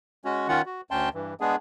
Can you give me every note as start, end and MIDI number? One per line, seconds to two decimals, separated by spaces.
0.25 0.48 56
0.25 0.48 61
0.25 0.48 66
0.48 0.62 51
0.48 0.62 61
0.48 0.62 65
0.48 0.62 78
0.66 0.81 66
0.91 1.09 38
0.91 1.09 61
0.91 1.09 79
0.91 1.09 81
0.91 1.09 84
1.14 1.34 43
1.14 1.34 52
1.40 1.56 56
1.40 1.56 59
1.40 1.56 62
1.40 1.56 68